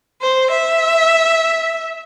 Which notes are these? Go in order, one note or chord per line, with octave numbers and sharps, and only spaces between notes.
C5
E5